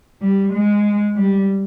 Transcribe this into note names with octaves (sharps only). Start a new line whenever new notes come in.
G3
G#3
G3